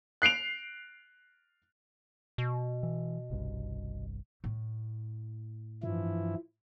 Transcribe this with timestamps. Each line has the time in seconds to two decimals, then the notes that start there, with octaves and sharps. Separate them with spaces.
0.22 F#6 C7 D7 F7
2.38 B2
2.83 E3
3.30 G1 C2 G2
4.44 A2
5.83 G2 E3 F3 E4